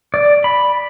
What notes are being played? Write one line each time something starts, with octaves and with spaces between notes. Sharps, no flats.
D5
B5